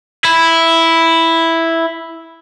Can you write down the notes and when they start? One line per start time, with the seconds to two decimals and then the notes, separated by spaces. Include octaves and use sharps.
0.25 E4